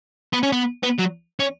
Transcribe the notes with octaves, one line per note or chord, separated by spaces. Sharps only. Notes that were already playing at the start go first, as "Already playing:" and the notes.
B3
C#4
B3
B3
F#3
C#4